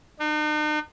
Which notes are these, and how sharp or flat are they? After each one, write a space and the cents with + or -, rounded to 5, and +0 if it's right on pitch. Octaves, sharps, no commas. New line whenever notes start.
D#4 -45